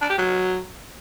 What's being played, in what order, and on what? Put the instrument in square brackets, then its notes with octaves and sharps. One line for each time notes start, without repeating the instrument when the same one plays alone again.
[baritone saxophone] D4
G4
F#3